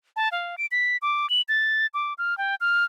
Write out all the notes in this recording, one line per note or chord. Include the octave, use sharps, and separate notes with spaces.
A5
F5
D7
B6
D6
F#7
A6
D6
F6
G5
F6